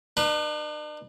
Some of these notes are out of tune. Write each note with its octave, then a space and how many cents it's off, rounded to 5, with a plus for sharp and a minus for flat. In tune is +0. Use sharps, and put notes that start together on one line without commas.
D4 +45 B4 -25